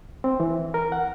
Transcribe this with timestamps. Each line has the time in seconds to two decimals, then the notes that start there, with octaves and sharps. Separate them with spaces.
0.24 C4
0.40 E3
0.74 A#4
0.92 F#5